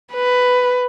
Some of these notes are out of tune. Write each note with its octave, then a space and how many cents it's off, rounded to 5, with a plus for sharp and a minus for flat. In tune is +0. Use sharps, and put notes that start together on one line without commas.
B4 +10